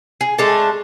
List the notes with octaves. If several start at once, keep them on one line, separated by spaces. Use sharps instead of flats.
G#4
G#3 A3 D4 A4